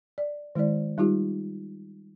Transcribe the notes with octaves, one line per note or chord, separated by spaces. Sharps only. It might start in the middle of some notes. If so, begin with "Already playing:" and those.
D5
D#3 G#3 E4 C5 D5
G3 D#4 F4 G4